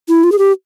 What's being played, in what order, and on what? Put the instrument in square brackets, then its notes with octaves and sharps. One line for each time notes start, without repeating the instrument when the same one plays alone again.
[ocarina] E4
F4
G#4
G4